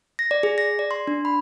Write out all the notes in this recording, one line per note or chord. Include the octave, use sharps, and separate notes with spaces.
A#6
D5
G#4
A#6
D5
C6
D4
B5